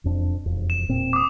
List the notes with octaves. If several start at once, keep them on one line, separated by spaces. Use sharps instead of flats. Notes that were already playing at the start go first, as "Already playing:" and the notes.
E1 F2 D4
E1 F2
E7
E1 A#2 C4
D6 D#6